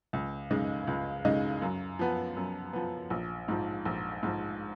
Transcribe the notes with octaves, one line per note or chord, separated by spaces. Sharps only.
C#2
C#3 G#3 D#4
C#2
C#3 G#3 D#4
F#2
F3 B3
F#2
F3 B3
A#1
G#2 F3
A#1
G#2 F3